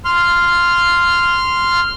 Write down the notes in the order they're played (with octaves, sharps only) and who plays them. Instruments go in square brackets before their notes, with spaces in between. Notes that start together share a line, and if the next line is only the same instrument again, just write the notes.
[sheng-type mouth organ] C6 F6